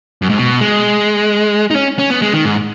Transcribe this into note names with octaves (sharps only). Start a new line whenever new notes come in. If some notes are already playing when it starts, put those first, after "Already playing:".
F#2
G#2
B2
G#3
D#4
C#4
C#4
B3
G#3
D#3
G#2